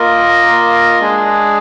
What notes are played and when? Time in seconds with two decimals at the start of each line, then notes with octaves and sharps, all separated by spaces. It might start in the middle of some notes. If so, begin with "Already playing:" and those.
Already playing: A#3 F4 A#4 D#5
0.99 G#3 D4 G#4